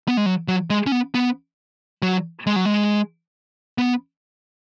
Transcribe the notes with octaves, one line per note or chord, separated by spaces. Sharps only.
B3
G#3
F#3
F#3
G#3
C#4
B3
B3
F#3
G#3
F#3
G#3
B3